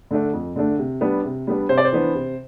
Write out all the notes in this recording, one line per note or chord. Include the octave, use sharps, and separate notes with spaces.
D3 A3 D4
F2
D3 A3 D4
C3
G3 B3 D4
C3
G3 B3 D4
C3 C5
D5
C5
E3 B3 D4
C3